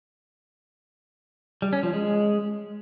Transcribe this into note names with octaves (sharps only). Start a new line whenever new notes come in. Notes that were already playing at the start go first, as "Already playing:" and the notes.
G3
C#4
F3
G#3